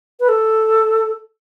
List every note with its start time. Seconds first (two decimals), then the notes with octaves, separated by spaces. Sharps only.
0.20 B4
0.28 A4